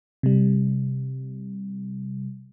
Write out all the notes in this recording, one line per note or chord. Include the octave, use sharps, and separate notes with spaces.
C3 G3